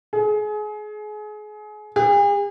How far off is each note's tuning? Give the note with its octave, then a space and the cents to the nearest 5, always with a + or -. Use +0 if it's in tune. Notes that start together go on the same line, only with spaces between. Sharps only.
G#4 +30
G#4 -45